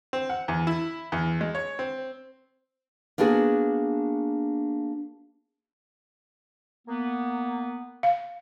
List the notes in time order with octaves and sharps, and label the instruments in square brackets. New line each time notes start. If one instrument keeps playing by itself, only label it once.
[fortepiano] C4
F#5
E2
E4
E2
G#3
C#5
C4
[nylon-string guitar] A#3 B3 D4 F#4 G#4
[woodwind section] A#3 B3
[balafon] F5